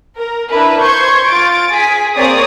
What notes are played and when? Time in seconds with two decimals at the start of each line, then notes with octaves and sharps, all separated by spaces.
0.19 A#4
0.50 D4 E4 A#4 B4
0.82 C5 C6 C#6 G6 G#6
1.27 F4 A6 D7
1.73 G#4 G#5 B6
2.15 A#3 C4 G#4 C#5 D5 D#6